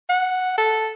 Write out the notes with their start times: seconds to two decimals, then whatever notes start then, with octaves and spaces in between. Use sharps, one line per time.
0.10 F#5
0.58 A4